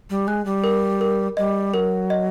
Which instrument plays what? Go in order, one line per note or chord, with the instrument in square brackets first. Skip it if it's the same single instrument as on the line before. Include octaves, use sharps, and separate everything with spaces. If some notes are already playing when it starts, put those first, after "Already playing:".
[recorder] G3
[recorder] G#3 [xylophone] F#6
[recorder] G3
[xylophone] A#4
A#4
[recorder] G3 [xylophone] D#5
[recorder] F#3 [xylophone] A#4
[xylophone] D#5